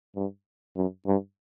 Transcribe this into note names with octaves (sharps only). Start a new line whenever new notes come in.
G2
F#2
G2